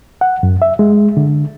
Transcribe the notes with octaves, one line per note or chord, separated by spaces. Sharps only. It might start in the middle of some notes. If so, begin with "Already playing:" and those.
F#5
F#2
E5
G#3
D3